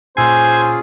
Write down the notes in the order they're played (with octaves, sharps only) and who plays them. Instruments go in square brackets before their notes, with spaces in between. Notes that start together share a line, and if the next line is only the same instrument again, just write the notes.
[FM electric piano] A#2 E6 C7 [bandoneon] C#4 F4 G#4 [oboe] C5 [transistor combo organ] G#5